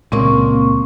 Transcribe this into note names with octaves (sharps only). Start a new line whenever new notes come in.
C#2 A#2 A#3 C4 C#6